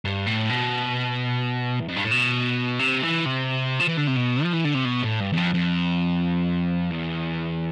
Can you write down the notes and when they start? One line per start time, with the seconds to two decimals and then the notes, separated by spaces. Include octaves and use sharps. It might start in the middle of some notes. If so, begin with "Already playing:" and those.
0.05 G2
0.27 A2
0.50 B2
1.81 E2
1.88 F2
1.96 G2
2.04 A2
2.11 B2
2.79 C3
3.02 E3
3.25 C3
3.80 F3
3.89 E3
3.98 D3
4.08 C3
4.17 B2
4.43 F3
4.53 E3
4.65 D3
4.75 C3
4.85 B2
5.03 A2
5.20 G2
5.33 E2
5.37 F2
5.54 F2
6.91 E2